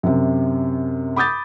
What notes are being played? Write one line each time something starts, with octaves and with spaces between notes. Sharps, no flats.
F#2 C3
B5 D6 D#6 G6 A6